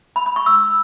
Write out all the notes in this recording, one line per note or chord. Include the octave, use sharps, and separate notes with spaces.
B5
B5
C#6
E6